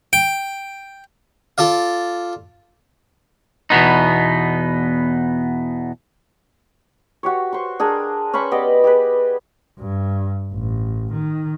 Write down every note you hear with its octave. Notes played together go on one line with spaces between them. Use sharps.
G5
F4 A4 D5 F5
E2 B2 B3 D#4
F#4 G4 C#5
C5 C#6
D4 G#4 A#4 G5
C#4 C5 B5 C#6
B3 G4 D5 D#5
G4 G#4 B4
G2
A1
D#3